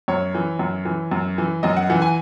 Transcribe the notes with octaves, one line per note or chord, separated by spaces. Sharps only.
F#2 C#5
E3
F#2
E3
F#2
E3
F#2 D#5
F#5
E3 F#5
G#5